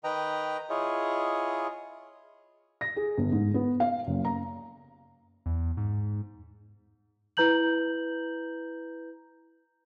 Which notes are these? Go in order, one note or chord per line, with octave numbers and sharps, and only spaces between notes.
D#3 B4 D#5 G5 A#5
E4 F4 G#4 C#5 D#5
A#6
G#4
G1
G#2
B3
F5
F#1
A#5
E2
G#2
E4 B4 A#5 G6 F#7